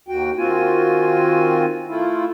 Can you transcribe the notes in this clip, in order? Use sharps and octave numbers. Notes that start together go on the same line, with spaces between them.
D#2 F#4 G5
D#3 C4 F4 F#4 G#5
A3 E4 F4